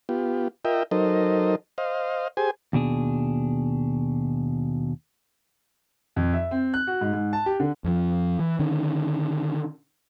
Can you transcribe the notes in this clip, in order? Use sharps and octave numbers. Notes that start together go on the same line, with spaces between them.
B3 F4 G4
F4 A#4 D#5 E5 G5
F#3 D#4 A4 A#4 C5 D#5
C5 D#5 F5
G4 G#4 C5 G#5
D#2 B2 D4 G#4
F2
E5
C4
F#6
F#4
G#2
G#2
A5
G4
D3
F2 F3
E3
D3 D#3 C#4